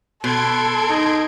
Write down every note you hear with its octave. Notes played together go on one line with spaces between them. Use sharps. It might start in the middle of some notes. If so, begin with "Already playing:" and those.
B2 A4 C6 G#6 D7
D#4